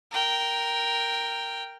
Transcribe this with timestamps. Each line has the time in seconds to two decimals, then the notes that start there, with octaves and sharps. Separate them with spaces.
0.11 A#4 G5